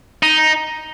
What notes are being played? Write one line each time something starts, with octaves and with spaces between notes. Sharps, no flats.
D#4